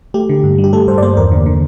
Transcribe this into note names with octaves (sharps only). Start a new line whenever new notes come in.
A3 G4
D3
G2
G3
G4
A3 A4
G2 C5
D5
A#3 C5
E2 A#4
D3
D3